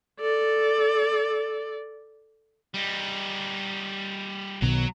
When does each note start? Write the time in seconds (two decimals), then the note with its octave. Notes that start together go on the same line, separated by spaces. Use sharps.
0.20 A4 D5
2.74 G3 D#4
4.62 B1 B2 D#3 F#3 A#5